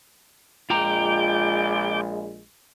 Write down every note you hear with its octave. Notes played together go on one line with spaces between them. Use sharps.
A#1 G#3 F4 G5 A#5 D6 G6